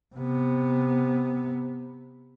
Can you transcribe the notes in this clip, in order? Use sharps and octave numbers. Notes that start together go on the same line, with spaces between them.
C3 B3